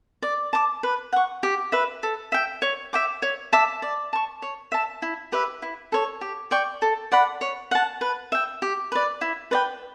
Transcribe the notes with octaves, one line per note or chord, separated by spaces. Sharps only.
D5
A5 D6
B4
F#5 C#6
G4
B4 E5
A4
E5 G5
C#5
E5 G5 D6
C#5
E5 A5 D6
D5
A5 C#6
C#5
E5 A5
E4
G4 B4 E5
E4
A4 C#5
G4
D5 G5 C#6
A4
D5 F#5 B5
C#5
F#5 A5
B4
E5 G5
G4
B4 D5
E4
B4 D5 G5